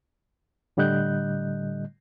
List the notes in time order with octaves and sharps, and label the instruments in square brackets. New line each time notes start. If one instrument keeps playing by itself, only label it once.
[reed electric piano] A2 D3 G3 D#5 F#6 G6